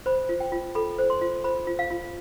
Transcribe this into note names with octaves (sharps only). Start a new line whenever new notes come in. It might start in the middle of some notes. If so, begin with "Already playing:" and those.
C5 B5
F4
G5
F4
A4 B5
C5
C6
F4
C5 B5
F4
F5
F4